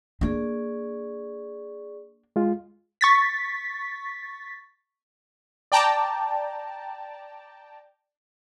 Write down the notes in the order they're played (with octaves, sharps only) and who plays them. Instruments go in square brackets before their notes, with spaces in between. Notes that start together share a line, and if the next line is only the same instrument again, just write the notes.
[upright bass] A#3 D4 [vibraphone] G#4 D5 C#6
[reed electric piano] G#3 F4
[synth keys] C#6 A6 B6
[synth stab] D5 G5 A5 A#5